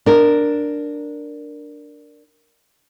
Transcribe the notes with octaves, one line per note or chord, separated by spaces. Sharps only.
D4 A#4